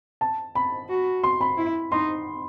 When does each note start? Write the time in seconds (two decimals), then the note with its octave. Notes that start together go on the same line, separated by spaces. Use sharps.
0.21 A5
0.55 B5
0.89 F#4
1.24 C6
1.41 B5
1.58 E4
1.92 D#4 C6